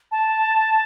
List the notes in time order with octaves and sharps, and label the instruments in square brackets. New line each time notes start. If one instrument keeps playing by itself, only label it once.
[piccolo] A5